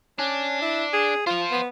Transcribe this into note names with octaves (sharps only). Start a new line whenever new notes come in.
C#4 D4
E4
G#4
F4 C5 F5
B3